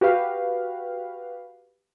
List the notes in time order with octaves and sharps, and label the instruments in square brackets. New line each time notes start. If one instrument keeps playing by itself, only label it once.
[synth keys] F#4 G4 B4 F5